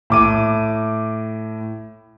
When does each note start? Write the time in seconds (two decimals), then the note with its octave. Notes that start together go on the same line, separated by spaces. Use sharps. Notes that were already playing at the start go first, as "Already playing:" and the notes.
0.10 A2 D6 D#7